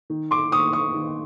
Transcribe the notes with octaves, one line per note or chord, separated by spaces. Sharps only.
D#3
C6 D6
D#3 C#6 D#6
C#6 D#6
D#3